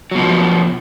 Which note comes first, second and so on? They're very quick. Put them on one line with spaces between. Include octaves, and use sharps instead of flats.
F#3 B2 F3